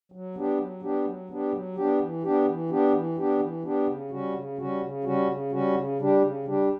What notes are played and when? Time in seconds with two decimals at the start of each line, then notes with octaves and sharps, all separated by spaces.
0.12 F#3
0.35 B3 D4 G4
0.58 F#3
0.82 B3 D4 G4
1.05 F#3
1.29 B3 D4 G4
1.52 F#3
1.76 B3 D4 G4
2.00 E3
2.23 B3 D4 G4
2.47 E3
2.69 B3 D4 G4
2.93 E3
3.17 B3 D4 G4
3.40 E3
3.64 B3 D4 G4
3.87 C#3
4.11 G3 C#4 F#4
4.34 C#3
4.58 G3 C#4 F#4
4.81 C#3
5.04 G3 C#4 F#4
5.28 C#3
5.51 G3 C#4 F#4
5.74 C#3
5.99 G3 D4 G4
6.22 C#3
6.45 G3 D4 G4